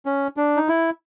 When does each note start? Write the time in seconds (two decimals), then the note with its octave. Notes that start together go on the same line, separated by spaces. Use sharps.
0.06 C#4
0.37 D4
0.57 D#4
0.68 E4